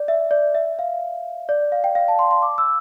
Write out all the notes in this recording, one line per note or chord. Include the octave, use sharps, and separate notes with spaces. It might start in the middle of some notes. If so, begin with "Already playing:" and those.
Already playing: D5
E5
D5
E5
F5
D5
F5
G5
F5
A5
C6
C6
D6
E6